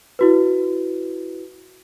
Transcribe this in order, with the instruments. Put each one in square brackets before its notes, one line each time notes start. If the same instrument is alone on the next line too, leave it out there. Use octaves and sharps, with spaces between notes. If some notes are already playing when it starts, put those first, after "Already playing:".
[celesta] E4 F#4 B4